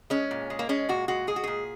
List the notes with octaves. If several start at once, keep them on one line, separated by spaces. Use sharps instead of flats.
G#3 C#4
A#2
G#3
A#3
G#3 C#4
A#2 F#4
G#3 F#4
G#3 G#4
F#4
A#2 G#4